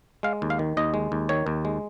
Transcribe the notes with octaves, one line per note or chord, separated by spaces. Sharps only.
G#3 F5
D#2
F5
D#3
D#2 D#5
G#3
D#2
D#3 C#5
D#2
G#3